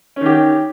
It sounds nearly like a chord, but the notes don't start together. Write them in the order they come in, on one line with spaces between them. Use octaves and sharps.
C#4 D#3 G4